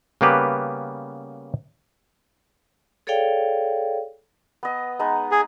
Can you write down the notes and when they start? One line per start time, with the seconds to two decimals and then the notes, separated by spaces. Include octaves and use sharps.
0.21 C#3 G3 A#3 B3 G4 B4
3.07 G#4 A4 C#5 D5 F5 G5
4.63 B3 D#5
4.99 G#3 B3 D#4
5.31 G#4